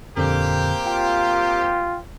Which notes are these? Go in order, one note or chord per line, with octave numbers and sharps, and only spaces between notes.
F2 A#2 D3 A#3 C4 G4
F4 G5